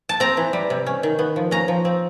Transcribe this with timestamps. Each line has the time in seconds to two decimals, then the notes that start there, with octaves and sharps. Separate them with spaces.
0.09 A5
0.20 C4 A#5
0.37 E3
0.53 G3
0.70 C3
0.86 C#4
1.03 D#3
1.19 B3
1.36 F3
1.51 C#4 A#5
1.68 F3
1.85 C4